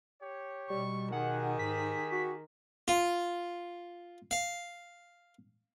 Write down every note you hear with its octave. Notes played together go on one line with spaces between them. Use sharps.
G4 C#5
B2 G3 C#6
D#3 G4 G#4 F#5
G#2 B6
F#4
F4
F5